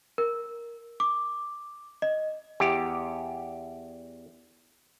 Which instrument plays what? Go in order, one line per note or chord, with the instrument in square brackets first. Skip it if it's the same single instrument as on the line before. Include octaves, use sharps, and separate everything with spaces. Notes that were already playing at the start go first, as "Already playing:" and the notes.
[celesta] A#4
D6
D#5
[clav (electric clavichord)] E2 G4